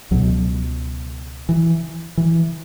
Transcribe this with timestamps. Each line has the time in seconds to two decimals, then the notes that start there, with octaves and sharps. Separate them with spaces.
0.11 C#2 B2 F#3
1.49 E3
2.17 E3